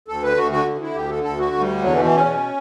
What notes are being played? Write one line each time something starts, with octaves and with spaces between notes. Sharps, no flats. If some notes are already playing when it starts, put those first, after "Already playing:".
D2 A4
D3 B4
D2 F#4
D3 F#4
D2
D3 E4
D2 G4
D3 A4
D2 A4
D3 F#4
D2
G3
D3
E2 F#3
E3
B2
E3
E2 C#4
B2